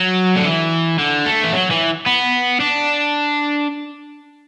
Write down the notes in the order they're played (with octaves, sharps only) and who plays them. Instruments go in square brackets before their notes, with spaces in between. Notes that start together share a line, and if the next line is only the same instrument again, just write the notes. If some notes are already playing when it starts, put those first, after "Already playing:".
Already playing: [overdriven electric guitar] F#3
D3
E3
D3
A3
E3
F#3
E3
B3
D4